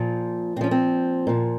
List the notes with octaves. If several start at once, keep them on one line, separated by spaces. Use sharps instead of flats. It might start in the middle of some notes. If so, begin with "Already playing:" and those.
Already playing: A#2 F3
A#2 F3 C4 C#4
C4
A#2 F3